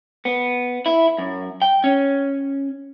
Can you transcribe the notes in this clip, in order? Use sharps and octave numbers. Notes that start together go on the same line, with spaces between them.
B3
E4
F#2
G5
C#4